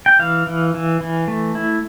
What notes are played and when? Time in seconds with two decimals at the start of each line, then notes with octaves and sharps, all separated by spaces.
0.06 G5
0.19 E3 F5
0.47 E3
0.74 E3
1.01 E3
1.28 A3
1.55 E4